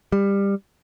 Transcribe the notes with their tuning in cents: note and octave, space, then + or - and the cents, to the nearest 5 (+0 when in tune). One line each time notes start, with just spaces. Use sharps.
G3 +20